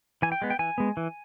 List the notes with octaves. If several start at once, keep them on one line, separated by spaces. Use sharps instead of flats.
E3 G#5
G5
G#3 B3
G5
E3 G#5
G#3 B3
E3